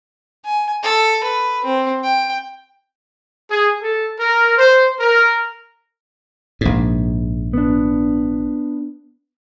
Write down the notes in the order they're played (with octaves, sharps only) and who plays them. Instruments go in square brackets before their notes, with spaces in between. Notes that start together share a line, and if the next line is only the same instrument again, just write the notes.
[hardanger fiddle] G#5
A4
B4
C4
G5
[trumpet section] G#4
A4
A#4
C5
A#4
[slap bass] A#1 G#2
[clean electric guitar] B3 D4